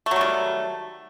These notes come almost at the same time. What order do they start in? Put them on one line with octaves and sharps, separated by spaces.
A3 F#3 G3 D#3